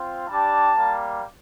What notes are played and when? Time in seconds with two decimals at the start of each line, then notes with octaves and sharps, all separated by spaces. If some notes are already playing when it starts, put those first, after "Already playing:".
Already playing: C4 F4
0.27 G3 D4 G4 A5
0.75 G3 A#3